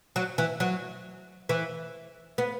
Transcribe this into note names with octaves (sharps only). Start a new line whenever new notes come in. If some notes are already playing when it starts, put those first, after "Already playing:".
F#3
E3
F#3
E3
B3